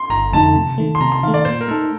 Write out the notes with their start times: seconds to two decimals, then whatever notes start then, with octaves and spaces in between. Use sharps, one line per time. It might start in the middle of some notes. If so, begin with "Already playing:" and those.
Already playing: C6
0.10 G1 A#5
0.32 F2 D3 A3 D#4 A5
0.56 C3
0.78 D#3 A3
0.95 C6
1.01 C3 A#5
1.12 C6
1.23 D#3 F5
1.28 A3
1.34 D5
1.45 A#2 C5
1.61 A#4
1.68 A3 D#4 A4